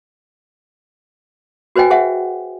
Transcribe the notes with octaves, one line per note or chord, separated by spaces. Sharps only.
F#4 B4 C5 D#5 G5 G#5
G#4 C5 E5 F#5